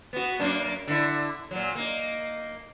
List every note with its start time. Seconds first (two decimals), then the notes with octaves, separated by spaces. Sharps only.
0.13 B3 F#4
0.40 F#2 A#3 D4
0.87 D3 E4
1.51 A#2 F#3
1.75 A#3 D#4